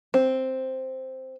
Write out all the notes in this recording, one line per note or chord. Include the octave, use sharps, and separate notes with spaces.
C4